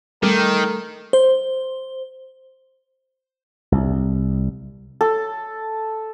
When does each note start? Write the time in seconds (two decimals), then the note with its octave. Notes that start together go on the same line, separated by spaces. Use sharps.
0.23 D#3 G3 A3 A#4
1.13 C5
3.72 C2
5.01 A4